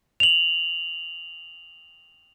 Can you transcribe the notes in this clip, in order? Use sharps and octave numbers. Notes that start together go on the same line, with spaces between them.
F7 F#7